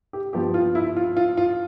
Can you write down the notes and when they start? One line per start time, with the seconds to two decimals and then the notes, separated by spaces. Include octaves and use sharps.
0.13 G4
0.33 G2 F3 B3 G4
0.54 F4
0.75 E4
0.97 F4
1.17 F4
1.37 F4